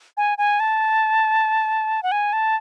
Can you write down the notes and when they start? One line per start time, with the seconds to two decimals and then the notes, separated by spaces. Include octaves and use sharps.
0.17 G#5
0.38 G#5
0.60 A5
2.03 F#5
2.12 G#5
2.33 A5